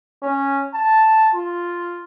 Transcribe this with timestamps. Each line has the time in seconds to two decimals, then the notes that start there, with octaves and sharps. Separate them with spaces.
0.23 C#4
0.74 A5
1.35 F4